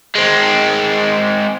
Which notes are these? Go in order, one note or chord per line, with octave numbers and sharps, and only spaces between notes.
G#3 C4